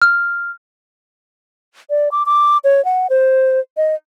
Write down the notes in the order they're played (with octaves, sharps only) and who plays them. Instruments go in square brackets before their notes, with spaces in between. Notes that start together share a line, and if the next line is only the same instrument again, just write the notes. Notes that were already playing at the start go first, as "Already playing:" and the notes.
[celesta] F6
[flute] D5
D6
D6
C#5
F#5
C5
D#5